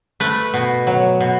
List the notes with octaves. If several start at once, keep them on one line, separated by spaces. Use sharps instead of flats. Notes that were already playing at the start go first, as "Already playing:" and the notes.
A3 B4
B2
F#3
B2